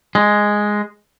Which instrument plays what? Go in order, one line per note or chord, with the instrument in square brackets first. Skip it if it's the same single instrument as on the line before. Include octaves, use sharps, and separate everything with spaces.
[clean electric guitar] G#3